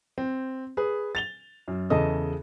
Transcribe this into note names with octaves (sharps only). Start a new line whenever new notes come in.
C4
G#4 B4
A6 F7 G7
F#2
E2 C#3 G#4 A4 D#5 D#6